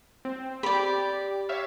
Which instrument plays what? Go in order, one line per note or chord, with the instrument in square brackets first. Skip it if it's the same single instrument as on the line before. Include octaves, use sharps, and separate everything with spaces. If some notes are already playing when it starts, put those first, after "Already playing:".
[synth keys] C4
[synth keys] G4 [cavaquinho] D5 B5
[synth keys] C#5 E5 F5